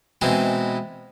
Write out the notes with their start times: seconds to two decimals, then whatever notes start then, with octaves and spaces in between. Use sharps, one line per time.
0.21 B2 E3 G#3 C4 D#4 G#4